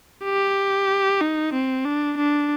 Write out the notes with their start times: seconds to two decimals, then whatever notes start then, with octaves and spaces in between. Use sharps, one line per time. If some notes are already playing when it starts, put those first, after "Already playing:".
0.24 G4
1.21 D#4
1.53 C4
1.85 D4
2.18 D4